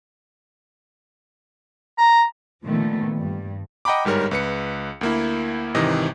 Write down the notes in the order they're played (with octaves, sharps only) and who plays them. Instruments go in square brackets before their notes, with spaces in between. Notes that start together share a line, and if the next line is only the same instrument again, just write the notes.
[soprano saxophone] A#5
[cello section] A#2 D3 D#3 F3 A3 B3
G2 G3
[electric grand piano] D#5 F#5 G5 A#5 B5 D6
G1 G#2 G3 A#4 C#5
C#2 B4 C#7
D2 A#3 E4
G#1 C3 D#3 E3 D#5